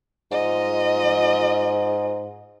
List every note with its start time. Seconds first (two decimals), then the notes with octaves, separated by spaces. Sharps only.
0.32 G#2 F4 D#5